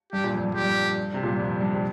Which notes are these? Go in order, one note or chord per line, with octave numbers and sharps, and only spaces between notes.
G2 G4
A#2
F2
G2
F2 G4
G2
C3
A#2
G2
F2
G2
C3